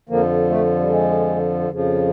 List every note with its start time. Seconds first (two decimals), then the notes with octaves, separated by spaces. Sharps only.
0.09 F2 D3 F3 A#3
0.50 A3
0.79 G3
0.90 G#3
1.70 F2 C#3 F3